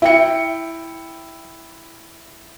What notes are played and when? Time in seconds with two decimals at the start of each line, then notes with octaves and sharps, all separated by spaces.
0.02 E4 G5 C#7